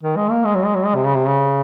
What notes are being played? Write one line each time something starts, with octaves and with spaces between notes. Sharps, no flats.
D#3
G#3
A#3
G#3
F#3
G#3
F#3
G#3
C3
C#3
C3
C#3